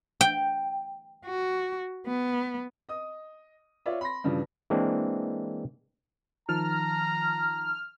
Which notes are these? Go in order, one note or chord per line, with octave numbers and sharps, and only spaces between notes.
G5
F#4
B3
D#5 D#6
F4 C#5 D5 E5
B5 C6 A#6
G2 C#3 E3 F3 G3
E3 G#3 A#3 C4 D4
D#3 F3 A5 A#5 F6